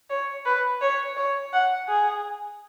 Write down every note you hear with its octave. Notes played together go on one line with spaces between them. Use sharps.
C#5
B4
C#5
C#5
F#5
G#4